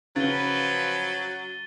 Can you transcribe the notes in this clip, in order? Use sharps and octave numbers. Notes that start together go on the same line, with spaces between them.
C#3 F3 F#3 B4 A6 D#7 G7